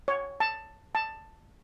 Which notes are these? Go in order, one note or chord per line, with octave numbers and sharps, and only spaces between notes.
C#5
A5
A5